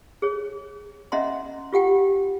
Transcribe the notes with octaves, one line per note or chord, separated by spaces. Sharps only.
G#4 C#5
C#4 D#5 E5 F#5 A#5 C6
F4 G4 F#5 G5